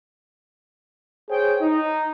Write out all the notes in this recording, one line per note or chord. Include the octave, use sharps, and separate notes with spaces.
G#4 C5 C#5 G5
D#4